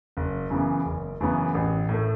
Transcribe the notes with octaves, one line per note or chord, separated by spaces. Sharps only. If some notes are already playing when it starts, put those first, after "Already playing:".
F#1
F#2 C#3 E3 B3
F#1
F#2 C#3 E3 B3
A1
A2
A3